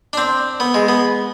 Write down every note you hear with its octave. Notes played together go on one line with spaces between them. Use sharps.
D4
C4
B3
G#3
B3